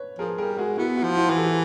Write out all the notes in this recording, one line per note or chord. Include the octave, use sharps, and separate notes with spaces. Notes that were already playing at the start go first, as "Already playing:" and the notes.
Already playing: B4 C#5
F3 G#4 A#4
G3 G#4 A#4
G#3 F#4 G#4
B3 E4 F#4
E4 F#4
F3
E4 F#4
E3
G4 A4